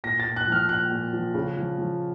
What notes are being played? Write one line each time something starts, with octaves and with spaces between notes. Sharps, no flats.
A#2 A#6
A6
A#2
F#6
F3
F6
A#2 F#6
A#2
F3
C#3
F3
F3